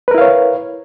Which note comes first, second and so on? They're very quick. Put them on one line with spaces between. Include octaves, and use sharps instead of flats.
B4 A#4 E4 F5 C#5